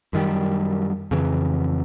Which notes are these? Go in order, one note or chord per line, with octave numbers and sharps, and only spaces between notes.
F#2 D#3 G3
F2 C#3 E3